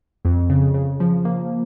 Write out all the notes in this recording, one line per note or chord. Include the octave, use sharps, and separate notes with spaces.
F2
C#3
C#3
F3
A#3